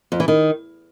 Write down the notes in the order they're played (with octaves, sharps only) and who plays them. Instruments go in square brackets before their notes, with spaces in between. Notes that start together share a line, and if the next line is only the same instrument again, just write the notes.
[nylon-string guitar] F2
E3
D#3